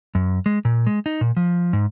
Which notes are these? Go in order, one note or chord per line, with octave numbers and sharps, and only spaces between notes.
F#2
G#3
A#2
G#3
D#4
A#2
F3
G#2